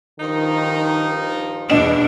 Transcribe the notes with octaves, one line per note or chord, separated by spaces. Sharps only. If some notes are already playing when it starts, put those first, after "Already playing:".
G2 D#3 F3 D#4
E2 B2 B3 D4 D#5 E7